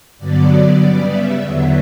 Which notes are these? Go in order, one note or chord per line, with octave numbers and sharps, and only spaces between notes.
G2 D3 F#3 B3 D5
C#3 G3 B3
E5
E2 D3 F#3 B3